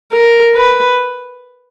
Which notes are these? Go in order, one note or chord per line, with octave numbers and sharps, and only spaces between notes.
A#4
B4